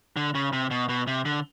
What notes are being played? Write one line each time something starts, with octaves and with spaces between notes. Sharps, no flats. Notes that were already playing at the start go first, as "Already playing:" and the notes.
D3
C#3
C3
B2
B2
C3
D3